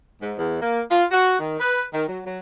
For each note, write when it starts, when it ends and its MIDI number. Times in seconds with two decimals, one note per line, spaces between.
0.21 0.33 44
0.38 0.58 40
0.62 0.81 58
0.91 1.04 65
1.11 1.39 66
1.40 1.57 51
1.60 1.84 71
1.93 2.04 51
2.09 2.20 54
2.25 2.40 54